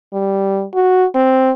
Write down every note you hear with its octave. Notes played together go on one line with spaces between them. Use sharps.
G3
F#4
C4